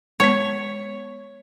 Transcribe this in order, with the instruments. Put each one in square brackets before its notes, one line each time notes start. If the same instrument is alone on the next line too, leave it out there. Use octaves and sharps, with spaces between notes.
[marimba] G#3 B3 [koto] C#5